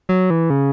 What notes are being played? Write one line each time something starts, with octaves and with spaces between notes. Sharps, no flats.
F#3
E3
C#3